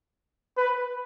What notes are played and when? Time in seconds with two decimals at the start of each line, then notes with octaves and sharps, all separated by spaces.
0.57 B4